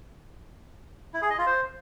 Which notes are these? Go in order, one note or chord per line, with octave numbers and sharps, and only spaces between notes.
E4
G#4
D#5
F4
C5